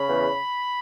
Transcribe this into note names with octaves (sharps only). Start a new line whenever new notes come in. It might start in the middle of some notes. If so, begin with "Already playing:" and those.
Already playing: C#3 B5
E2